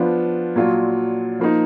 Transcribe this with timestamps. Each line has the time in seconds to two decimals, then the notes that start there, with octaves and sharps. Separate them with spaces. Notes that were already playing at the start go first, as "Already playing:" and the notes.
Already playing: F3 B3 D4 F4
0.56 A#2 F#3 D4 F4
1.40 F3 A#3 D#4